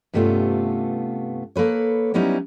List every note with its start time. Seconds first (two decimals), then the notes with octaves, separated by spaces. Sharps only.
0.13 G2 C3 A3 B3 C#4 F4
1.56 A#3 A4 B4 C#5
2.14 F#3 G3 B3 C#4 D#4 E4